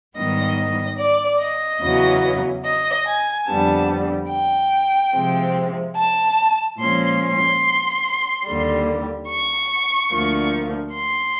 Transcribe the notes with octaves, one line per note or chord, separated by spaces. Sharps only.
G#2 D#3 G3 B3 D#5
D#5
D5
D#5
E2 C#3 F#3 B3
D#5
G#5
F2 D3 G3 B3 A5
G5
C3 F3 G#3 C4
A5
A#2 F3 G#3 C#4 C6
C6
D#2 D3 G3
C#6
D2 D3 F3 A#3
C6